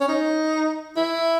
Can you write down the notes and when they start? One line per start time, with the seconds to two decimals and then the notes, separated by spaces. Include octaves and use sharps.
0.01 C#4
0.08 D#4
0.97 E4